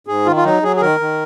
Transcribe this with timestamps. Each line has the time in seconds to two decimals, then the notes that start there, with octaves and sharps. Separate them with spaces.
0.07 G#2 G#4
0.26 D#3 F4
0.36 F4
0.44 F#3 D#4
0.63 F#3 G#4
0.76 G#4
0.81 D#3 A#4
1.00 D#3